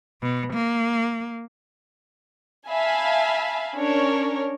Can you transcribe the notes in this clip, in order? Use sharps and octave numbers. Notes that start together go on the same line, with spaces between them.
B2
A#3
E5 F5 G#5 A5 B5
C#4 D4 A#4 C#5